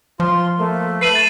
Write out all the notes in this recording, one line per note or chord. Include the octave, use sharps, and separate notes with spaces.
F3 F4 C6
A3 A#3
B4 C7 D#7 F#7
A6 E7